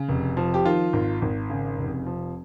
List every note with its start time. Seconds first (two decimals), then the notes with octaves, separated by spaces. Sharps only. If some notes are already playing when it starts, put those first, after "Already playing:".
Already playing: C#3
0.09 F1
0.37 F3
0.54 G4
0.65 D#3 F4
0.93 G#1
1.22 G#1
1.50 C#3
1.78 F1
2.06 F3